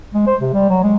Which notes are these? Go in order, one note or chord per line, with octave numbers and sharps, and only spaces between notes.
G#3
C5
C3
G3
F#3
G#3